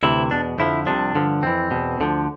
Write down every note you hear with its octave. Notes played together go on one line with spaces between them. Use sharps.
D2 C3 E3 E4
E2 B2 D4
F2 D3 F3 E4
C2 C3 F3 D4
G2 D3 F3
F2 E3 C4
E2 B2
D2 D3 F3